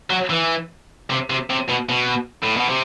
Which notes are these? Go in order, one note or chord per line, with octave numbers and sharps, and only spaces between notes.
F#3
E3
C3
C3
C3
B2
B2
A2
B2
C3